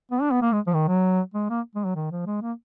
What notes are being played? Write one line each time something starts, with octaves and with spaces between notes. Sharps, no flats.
B3
D4
B3
A#3
G#3
F3
D#3
F#3
G#3
A#3
G#3
F#3
D#3
F3
G#3
A#3